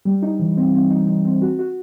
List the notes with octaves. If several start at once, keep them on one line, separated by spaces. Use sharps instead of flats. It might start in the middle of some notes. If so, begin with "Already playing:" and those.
G3
D#4
E3
C4
C4
D#4
D#4
C4
F#4
F#4